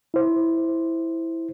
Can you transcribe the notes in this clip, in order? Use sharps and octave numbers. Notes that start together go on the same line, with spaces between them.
E4 C5